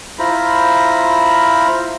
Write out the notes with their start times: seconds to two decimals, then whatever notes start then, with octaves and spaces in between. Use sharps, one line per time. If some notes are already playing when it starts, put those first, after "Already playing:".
0.19 E4 F4 C5 A#5 B5